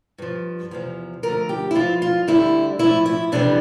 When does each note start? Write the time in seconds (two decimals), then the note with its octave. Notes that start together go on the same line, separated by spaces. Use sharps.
0.18 G2 F3
0.71 E2 C3 F3
1.23 D2 D3 F3 A#4
1.49 G4
1.71 E4
1.75 G2 F3 F4
2.02 F4
2.28 D2 D3 G3 E4
2.79 A2 F3 E4
3.06 E4
3.32 F2 C3 E3 G3 D4